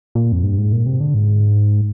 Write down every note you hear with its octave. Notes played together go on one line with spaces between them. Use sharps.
A#2
F2
G2
G#2
A#2
C3
D3
G#2